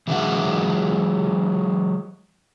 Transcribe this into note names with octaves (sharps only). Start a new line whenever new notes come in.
E3 F#3 G#3 D#5 E5 F#5